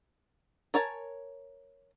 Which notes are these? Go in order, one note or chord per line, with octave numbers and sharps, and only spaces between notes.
A#4 C#5 G#5 A5